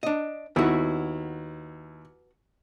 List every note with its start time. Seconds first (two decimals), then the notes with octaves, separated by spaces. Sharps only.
0.03 D4 D#5
0.56 D#2 B3 E4 F#4